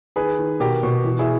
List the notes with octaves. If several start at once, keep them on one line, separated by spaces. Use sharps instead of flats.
D#3 G#4 B4
D#3
B2 G4 A#4
B2
E3
E4 G#4